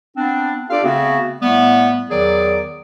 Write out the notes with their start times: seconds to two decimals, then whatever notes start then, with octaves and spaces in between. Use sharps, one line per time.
0.16 B3 C4 D4
0.69 D4 F4 G4 A4 D5 F5
0.84 C#3 A3 B3 C4 F#4
1.41 A2 G3 A3 B3
2.10 E2 D#3 F#3 G#4 D5